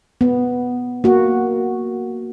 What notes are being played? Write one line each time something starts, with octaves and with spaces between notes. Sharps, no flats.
B3
A#3 F#4